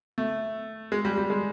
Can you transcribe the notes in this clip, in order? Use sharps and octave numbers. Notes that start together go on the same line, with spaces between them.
A3
G#3
G3
G3
G#3